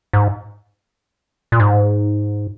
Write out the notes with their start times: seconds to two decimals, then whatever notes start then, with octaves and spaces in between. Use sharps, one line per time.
0.13 G#2
1.52 A#2
1.60 G#2